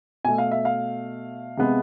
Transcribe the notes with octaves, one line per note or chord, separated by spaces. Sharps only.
B2 A3 G#5
F5
E5
F5
C3 G#3 B3